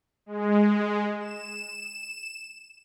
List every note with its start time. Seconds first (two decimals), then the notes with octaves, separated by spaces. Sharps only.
0.26 G#3
1.20 E7